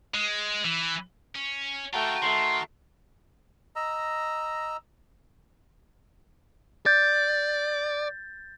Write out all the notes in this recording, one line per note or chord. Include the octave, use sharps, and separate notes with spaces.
G#3
E3
C#4
D3 A3 F4 F#4 G5 A5 A#5
D#3 A3 C6
D#5 A#5 E6
D5 G6 A6